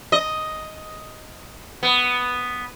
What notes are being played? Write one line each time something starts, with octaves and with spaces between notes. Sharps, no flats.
D#5
B3